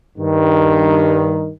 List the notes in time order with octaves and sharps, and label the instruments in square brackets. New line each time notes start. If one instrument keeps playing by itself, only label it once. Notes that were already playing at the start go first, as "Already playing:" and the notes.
[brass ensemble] G2 D#3